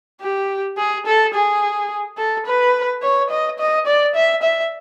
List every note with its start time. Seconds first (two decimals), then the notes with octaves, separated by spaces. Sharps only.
0.21 G4
0.78 G#4
1.06 A4
1.34 G#4
2.18 A4
2.46 B4
3.02 C#5
3.30 D#5
3.59 D#5
3.86 D5
4.15 E5
4.43 E5